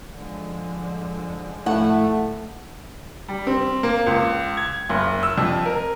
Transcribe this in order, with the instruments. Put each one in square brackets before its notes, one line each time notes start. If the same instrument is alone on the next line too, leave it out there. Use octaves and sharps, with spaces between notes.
[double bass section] D3 F3 G#3
[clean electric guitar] A2 [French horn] A3 [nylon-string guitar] F#5
[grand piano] G3
C4
A#3
C#2
G#6
F#1
E6
F2
A#4